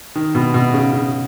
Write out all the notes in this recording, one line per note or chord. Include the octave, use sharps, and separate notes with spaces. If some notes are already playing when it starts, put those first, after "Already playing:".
D#3
B2
B2
C#3
C#3